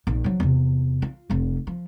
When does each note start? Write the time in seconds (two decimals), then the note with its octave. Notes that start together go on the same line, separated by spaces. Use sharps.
0.07 A#1 D#3
0.24 F3 F#3
0.40 E2 C3
1.02 F4
1.30 F1 F2
1.67 F3